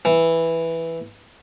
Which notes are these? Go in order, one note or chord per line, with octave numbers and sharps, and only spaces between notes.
E3